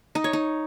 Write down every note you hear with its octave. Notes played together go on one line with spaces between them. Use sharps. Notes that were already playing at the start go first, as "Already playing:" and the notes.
D#4
C#5
D#4